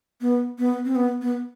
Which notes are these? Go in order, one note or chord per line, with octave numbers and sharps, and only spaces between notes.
B3
B3
C4
B3
B3